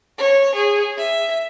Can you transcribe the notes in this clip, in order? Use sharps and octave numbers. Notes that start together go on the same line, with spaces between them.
C#5
G#4
E5